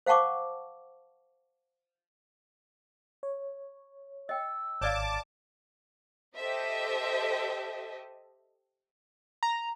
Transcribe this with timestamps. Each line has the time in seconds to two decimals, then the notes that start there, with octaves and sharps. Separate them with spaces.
0.06 C5 F5 F#5 A5 C#6 D6
3.23 C#5
4.29 D#5 G5 E6
4.81 G#1 C#5 D5 F5 A5 D6 F6
6.36 G4 A4 C5 D#5 E5
9.43 A#5